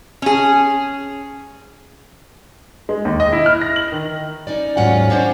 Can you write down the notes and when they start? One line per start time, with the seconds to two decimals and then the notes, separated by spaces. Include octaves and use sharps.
0.22 C#4 G#4
2.89 G#3
3.05 D#2
3.20 D#5
3.32 E4
3.46 F6
3.61 A#6
3.76 F#7
3.92 D#3
4.47 C#4 D#4 D5
4.77 D#2 G#2 F#3 C#4 F4 F#5
5.10 C#4 D4 C5 C#5